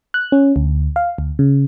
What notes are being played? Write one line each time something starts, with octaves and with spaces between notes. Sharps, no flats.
F#6
C#4
D2
F5
D2
C#3